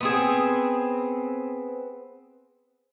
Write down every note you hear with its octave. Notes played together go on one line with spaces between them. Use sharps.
B3 C4 G#4